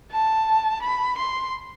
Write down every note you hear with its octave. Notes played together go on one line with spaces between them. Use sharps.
A5
B5
C6